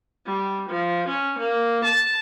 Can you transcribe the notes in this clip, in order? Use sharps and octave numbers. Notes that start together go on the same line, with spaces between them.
G3
F3
C#4
A#3
A5